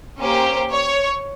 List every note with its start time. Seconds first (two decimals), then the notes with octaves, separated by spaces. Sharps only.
0.19 A#3 C#4 G4 C5
0.71 C#5